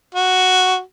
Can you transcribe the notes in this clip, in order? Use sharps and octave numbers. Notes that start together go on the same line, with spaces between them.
F#4